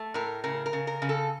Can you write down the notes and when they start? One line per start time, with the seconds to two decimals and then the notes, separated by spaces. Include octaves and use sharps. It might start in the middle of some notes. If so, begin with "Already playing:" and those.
Already playing: A3
0.14 A2 A#4
0.44 C#3 A#4
0.66 A#4
0.73 C#3
0.87 A#4
1.02 C#3
1.09 A4